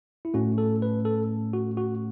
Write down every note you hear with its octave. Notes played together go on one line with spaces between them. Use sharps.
E4
A2 A3 C#4 F#4
A4
B4
A4
F#4
F#4